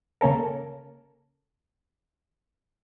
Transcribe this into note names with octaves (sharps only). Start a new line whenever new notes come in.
C#3 A#3 C#4 A4 A#4